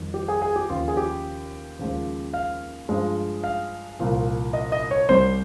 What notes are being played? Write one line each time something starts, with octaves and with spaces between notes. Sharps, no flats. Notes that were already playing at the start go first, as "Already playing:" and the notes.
Already playing: F2 D#3 G3
G4
G#4
G#4
G4
D#2 C#3 F3 F4
G#4
G4
D#2 C#3 F3 G#3
F5
G2 F3 G#3
F5
C2 A#2 F3
D#5
D#5
C#5
C2 C3 G3 C5